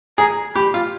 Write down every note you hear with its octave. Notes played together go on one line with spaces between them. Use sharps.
G#4 A#5
G4 B5
F4